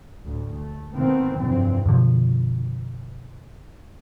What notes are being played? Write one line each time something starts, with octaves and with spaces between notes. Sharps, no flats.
D2 A2
A3
D#3 A3 B3 C4
F1 G2 E3 F#3 C4
F#2 B2 D3 F3